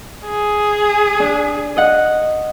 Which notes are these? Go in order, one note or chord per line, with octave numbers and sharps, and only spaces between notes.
G#4
D4
D#5 F#5